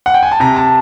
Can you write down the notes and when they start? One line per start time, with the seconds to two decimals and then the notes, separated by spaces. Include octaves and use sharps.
0.06 F#5
0.14 G5
0.23 G#5
0.31 A5
0.40 C3 A#5
0.56 A5